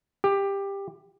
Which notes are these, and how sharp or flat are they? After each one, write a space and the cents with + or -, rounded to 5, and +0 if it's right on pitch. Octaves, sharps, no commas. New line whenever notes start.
G4 +15